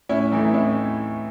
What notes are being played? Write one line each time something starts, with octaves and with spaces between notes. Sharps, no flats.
A2 C#4 E4
E3 A3 D#4
D#4
A2 C#4 E4